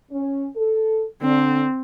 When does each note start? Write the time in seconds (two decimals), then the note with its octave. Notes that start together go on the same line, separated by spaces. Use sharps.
0.12 C#4
0.56 A4
1.22 D3 C4